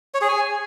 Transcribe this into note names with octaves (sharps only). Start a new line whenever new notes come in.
C#5
G#4
G#5